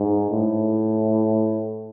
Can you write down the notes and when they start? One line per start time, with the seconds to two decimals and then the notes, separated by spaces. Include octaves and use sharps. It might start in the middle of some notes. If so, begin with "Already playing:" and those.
Already playing: G#2
0.31 A2